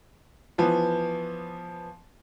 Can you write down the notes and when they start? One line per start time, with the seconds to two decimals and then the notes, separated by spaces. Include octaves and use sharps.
0.58 E3 F3 B3